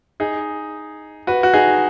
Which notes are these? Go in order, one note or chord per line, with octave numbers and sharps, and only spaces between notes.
D#4 G#4
F#4 B4
F#4
D#4 G#4